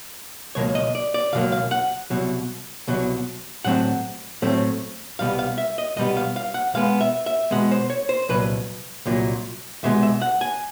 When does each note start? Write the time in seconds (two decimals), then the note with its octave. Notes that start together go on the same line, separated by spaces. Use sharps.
0.55 C#2 B2 F#3 A#3 C#5
0.75 D#5
0.95 D5
1.14 D5
1.33 C#2 B2 F#3 A#3 F5
1.52 F5
1.71 F#5
2.10 C2 B2 F#3
2.88 C2 B2 F#3
3.65 A2 F#3 A3 C4 F#5
4.42 A2 F#3 A3 C4
5.19 C2 B2 G3 B3 F5
5.39 F5
5.58 E5
5.78 D#5
5.96 C2 B2 G3 B3 D#5
6.17 F5
6.36 F5
6.54 F#5
6.74 B2 G#3 B3 F5
7.01 E5
7.26 E5
7.51 B2 G#3 B3 F#5
7.72 C5
7.90 C#5
8.09 C5
8.29 C2 A#2 F#3 B4
9.06 C2 A#2 F#3
9.83 C2 B2 G#3 B3 E5
10.03 E5
10.22 F#5
10.41 G#5